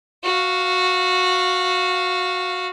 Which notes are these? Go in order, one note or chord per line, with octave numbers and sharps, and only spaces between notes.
F#4 F5